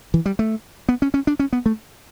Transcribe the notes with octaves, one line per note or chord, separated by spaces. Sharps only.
E3
G3
A3
B3
C#4
C#4
D4
C#4
B3
A3